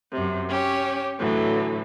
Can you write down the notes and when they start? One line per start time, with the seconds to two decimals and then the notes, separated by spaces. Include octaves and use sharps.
0.12 F#2 C3
0.49 C#4 G4 C#5
1.20 A2 D3 E3 F#3